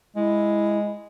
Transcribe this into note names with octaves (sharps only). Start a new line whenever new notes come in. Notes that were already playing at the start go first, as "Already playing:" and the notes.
G#3 E4